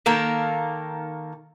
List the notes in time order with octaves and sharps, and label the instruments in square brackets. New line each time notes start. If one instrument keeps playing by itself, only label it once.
[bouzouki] D#3 A#3 A4 A#4